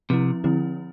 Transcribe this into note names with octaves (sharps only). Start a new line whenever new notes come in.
C3 F3 C4 E4
D3 F3 C4 E4